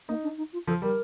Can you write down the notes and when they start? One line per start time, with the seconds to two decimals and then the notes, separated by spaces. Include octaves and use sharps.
0.08 A#3 D#4
0.23 D4
0.38 D#4
0.53 F4
0.67 F3 A4
0.82 G3 A#4